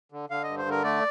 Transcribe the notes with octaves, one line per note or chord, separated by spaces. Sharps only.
D3
D3 F5
G2 D#5
C5
D3
A#4
A3 D5